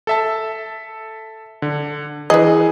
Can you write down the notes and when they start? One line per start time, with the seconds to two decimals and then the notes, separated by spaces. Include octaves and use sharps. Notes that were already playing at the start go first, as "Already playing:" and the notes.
0.07 A4 E5 A5
1.62 D3
2.30 E3 G#4 B4 D#5